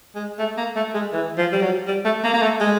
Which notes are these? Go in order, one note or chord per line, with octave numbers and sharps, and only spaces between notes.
G#3
A3
A#3
A3
G#3
E3
F3
G3
F#3
G3
A3
A#3
A#3
A3
G#3